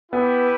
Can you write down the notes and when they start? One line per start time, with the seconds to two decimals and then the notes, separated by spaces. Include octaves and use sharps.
0.12 B3 E4 G4 B4